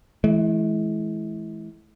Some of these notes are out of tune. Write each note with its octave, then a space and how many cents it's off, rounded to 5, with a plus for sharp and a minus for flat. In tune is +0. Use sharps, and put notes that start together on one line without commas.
E3 +0 G#3 +45